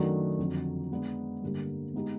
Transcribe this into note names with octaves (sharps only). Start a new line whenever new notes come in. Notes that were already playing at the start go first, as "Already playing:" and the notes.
Already playing: F#2 D#3 F#3 A3 D4
F2 D3 F#3
G#3 B3 D4
G2 D3 G3 A#3
G#3 B3 D#4 G4